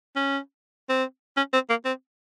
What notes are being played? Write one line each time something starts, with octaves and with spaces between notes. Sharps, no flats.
C#4
C4
C#4
C4
A#3
C4